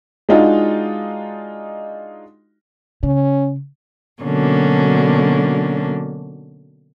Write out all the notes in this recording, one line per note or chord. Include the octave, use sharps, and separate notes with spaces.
G#3 D4 D#4 F4 F#4
C#3 C#4
B2 D3 F#3 A#3 C#4 D4